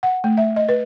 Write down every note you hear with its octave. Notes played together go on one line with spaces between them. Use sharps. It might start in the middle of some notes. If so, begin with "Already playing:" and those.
F#5
A3
E5
D#5
B4